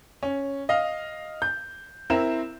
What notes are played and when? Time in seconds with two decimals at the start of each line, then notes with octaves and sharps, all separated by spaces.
0.23 C#4
0.69 D#5 F5
1.42 G6
2.10 C4 E4 A#4 E7